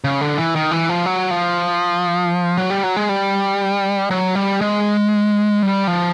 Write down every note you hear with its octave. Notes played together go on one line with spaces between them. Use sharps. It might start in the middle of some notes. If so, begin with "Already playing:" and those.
C#3
D3
E3
D#3
E3
F3
F#3
F3
F#3
G3
F#3
G#3
G3
F#3
G3
G#3
G3
F3